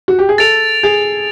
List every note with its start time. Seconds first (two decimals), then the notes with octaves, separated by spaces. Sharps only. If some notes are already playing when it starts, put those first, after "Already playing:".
0.08 F#4
0.19 G4
0.29 G#4
0.38 A4 A6 D7 F7
0.83 G#4